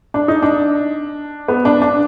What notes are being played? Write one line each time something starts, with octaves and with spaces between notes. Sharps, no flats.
D4
D#4
D4
B3
D4
D4